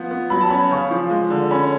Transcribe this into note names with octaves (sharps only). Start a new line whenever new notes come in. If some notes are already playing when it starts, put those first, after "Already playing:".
Already playing: F3 B3
B3
F#3 B5
A5
C#4 B5
C#3 C#6
F3
G#3
D3
C#4 B5